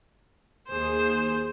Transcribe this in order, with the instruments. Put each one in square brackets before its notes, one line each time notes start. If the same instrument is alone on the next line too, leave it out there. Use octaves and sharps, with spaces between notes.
[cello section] D#2 G#4 [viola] C5